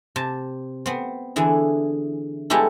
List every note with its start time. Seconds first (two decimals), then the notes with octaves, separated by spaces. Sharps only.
0.16 C3 A5
0.86 B3 C4
1.36 D3 E3 E4 G#4
2.50 G3 G#3 B3 E4 G4 A4